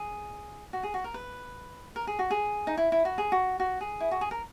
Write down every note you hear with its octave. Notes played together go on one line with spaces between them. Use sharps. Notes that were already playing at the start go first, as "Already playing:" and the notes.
Already playing: G#4
F#4
G#4
F#4
A#4
B4
A#4
G#4
F#4
G#4
D#4
E4
E4
F#4
G#4
F#4
F#4
G#4
E4
F#4
G#4
A#4